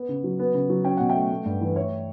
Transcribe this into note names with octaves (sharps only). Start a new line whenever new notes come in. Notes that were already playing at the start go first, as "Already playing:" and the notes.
Already playing: B3
C#3
F#3
B3
C#3
F#3
C#4 G5
B2 F#5
E5 G5
A3
A3
G2
E3
A3 C#5 E5